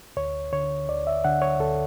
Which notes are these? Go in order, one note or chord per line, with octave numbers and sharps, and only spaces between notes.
D2 C#5
D3 C#5
D2 D5
E5
D3 F#5
C#5
D2 A4